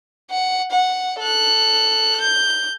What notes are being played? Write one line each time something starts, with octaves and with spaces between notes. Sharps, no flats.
F#5
F#5
A4 F#6
G6